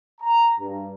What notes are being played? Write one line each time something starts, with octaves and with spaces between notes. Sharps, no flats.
A#5
G2